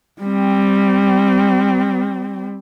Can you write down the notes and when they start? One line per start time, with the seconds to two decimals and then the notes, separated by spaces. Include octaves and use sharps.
0.21 G3 C4